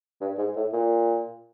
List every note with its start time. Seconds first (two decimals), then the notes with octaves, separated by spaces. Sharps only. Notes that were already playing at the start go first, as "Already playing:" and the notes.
0.21 G2
0.38 G#2
0.56 A2
0.73 A#2